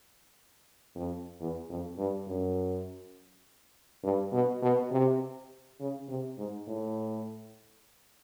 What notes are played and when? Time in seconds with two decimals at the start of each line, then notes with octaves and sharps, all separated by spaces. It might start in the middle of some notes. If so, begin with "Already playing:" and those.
0.95 F2
1.40 E2
1.69 F2
1.98 G2
2.27 F#2
4.04 G2
4.33 B2
4.62 B2
4.91 C3
5.80 C#3
6.08 C3
6.38 G#2
6.67 A2